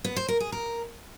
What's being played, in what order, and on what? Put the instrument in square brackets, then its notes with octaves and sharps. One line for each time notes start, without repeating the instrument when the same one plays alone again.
[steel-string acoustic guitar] B3
C5
A#4
G#4
A#4